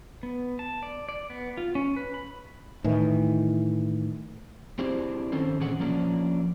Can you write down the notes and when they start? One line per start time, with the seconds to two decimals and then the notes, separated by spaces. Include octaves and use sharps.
0.23 B3
0.59 A5
0.83 D5
1.09 D5
1.30 B3
1.57 F4
1.75 C#4
1.96 B4
2.14 B5
2.84 A2 D#3 E3
4.79 C4 D4 E4 G4 G#4 C5
5.32 D#3 C4 C#4 A4 C5
5.60 A#2 D3 E3 C#4 G#4 F#5
5.80 F3 A#3 C#4 D4